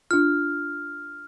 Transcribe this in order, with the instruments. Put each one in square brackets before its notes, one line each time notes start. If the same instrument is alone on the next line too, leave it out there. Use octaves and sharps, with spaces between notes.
[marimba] D4 F4 [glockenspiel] F6